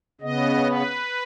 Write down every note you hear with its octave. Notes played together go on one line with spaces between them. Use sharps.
C#3 B3 D#5
B4